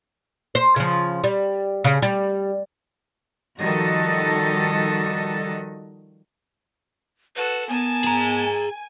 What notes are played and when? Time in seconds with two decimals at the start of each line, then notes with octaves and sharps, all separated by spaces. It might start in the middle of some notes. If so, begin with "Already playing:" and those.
0.55 C5
0.76 C#3 F3
1.24 G3
1.84 C#3
2.02 G3
3.60 D#3 F3 G3 F#4 A4 D#5
7.36 F#4 A4 B4
7.69 B3 A#4 G#5 A5
8.04 G#4 A#5